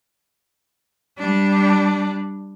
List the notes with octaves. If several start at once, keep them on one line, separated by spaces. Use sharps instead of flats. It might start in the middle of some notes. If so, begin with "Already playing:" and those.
G3 D4